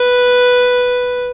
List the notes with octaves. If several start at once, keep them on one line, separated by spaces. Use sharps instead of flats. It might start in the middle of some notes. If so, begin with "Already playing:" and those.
Already playing: B4